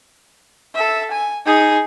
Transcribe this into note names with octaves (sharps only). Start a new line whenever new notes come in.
A4 E5
G#5
D#4 G#4